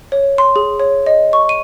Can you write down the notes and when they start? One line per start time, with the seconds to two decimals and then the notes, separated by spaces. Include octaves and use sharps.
0.12 C#5
0.38 C6
0.56 G#4
0.79 C#5
1.06 D#5
1.33 C#6
1.49 D#7